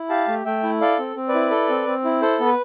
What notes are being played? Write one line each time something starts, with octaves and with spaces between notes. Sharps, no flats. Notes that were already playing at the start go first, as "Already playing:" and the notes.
Already playing: E4
G4 F5 A5
A3
A3 E5 G5
E4
A4 D5 F5
C4
C4
B4 D5
E4
A4
C4
C4
E4
A4 C5
B3
B4